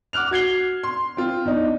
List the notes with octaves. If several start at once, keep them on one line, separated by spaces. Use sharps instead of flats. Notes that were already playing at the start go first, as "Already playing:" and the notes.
F#5 D6 F6 F#6 F7
F#4 G#6 C7 G7
C6
C4 F4
E2 D4 D#4